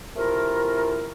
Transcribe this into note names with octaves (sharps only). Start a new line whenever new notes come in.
C3 A3 E4 F4 A#4